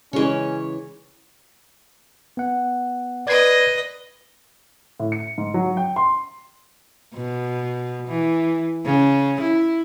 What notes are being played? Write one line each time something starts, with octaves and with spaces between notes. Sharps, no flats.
C#3 E3 G#3 C#4 C#5
B3 F#5
B4 D5 D#5 G#6 C7
A2
C#7
G#2
F#3
G5
C6
B2
E3
C#3
E4